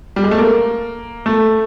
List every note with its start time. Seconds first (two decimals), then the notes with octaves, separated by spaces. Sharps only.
0.16 G3
0.24 G#3
0.31 A3
0.38 A#3
1.26 A3